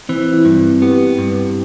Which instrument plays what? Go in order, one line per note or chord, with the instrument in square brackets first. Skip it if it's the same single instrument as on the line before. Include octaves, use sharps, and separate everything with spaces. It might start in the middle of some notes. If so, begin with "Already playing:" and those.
[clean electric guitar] E3 [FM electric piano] C4
[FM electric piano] C4 E4
[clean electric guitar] G2
[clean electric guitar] B3 [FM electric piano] G4 B4
[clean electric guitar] G2